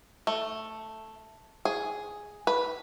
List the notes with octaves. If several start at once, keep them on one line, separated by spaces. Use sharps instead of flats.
A3
G#4
B4